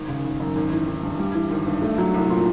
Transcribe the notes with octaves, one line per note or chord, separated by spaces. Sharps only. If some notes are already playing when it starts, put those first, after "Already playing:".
Already playing: G#1
C#3
G#1
F#2
G#1
E3
G#1
G2
G3
E3
G#1
G2
A3
F#3
C2
A#2